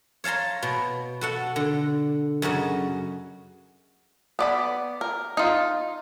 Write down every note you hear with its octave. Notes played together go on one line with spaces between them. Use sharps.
C#5 F5 A5 A#5 C6
B2
F#4 A4 F#5
D3
F#2 C#3 F#4 D#5
B3 D5 B5
A#4
D#4 F4